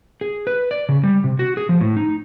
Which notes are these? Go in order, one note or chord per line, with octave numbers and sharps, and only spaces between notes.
G#4
B4
D5
C#3
G3
C3
F#4
G#4
F3
A2
D#4